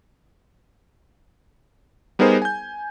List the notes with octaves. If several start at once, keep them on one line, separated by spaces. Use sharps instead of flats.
G3 B3 D#4 G#4 A#4 C5
G#5 G6